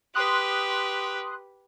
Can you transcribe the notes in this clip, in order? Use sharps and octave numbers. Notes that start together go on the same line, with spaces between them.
G4 B4 C6 D#6 F#6